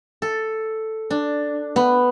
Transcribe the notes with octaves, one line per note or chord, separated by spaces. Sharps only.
A4
D4
B3